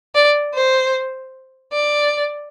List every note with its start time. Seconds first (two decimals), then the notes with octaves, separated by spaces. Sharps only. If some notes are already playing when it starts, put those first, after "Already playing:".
0.15 D5
0.54 C5
1.72 D5